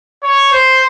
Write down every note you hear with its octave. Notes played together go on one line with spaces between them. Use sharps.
C#5
C5